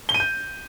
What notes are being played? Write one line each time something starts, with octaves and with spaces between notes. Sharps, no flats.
G7
D#7
G6